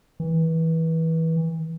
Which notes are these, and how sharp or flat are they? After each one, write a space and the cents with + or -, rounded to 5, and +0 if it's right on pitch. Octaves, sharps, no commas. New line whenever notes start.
E3 -25